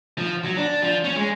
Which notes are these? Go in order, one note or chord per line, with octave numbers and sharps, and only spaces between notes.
F3
F#3
D4
F3
C#4
G#3